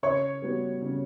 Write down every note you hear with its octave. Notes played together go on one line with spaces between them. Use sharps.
C#3 C#5 C#6
G3 B3 F#4
C#3